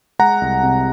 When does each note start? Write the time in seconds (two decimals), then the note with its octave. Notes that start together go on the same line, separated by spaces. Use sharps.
0.19 G#3 F#5 A#5
0.41 C2
0.63 C3